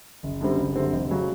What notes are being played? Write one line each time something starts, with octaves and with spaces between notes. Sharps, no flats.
F#1
F#2 D3 G3 C4
F#1
F#2 D3 G3 C4
F1
C#3 F#3